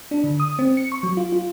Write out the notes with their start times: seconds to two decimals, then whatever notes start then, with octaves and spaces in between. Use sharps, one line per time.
0.11 D4
0.24 D3
0.40 D#6
0.59 C4
0.77 C#7
0.92 C#6
1.03 F#3
1.17 F4
1.32 F4